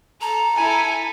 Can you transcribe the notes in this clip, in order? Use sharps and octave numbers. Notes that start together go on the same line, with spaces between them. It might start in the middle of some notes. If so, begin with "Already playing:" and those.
A4 A#5
E4 A4 G#5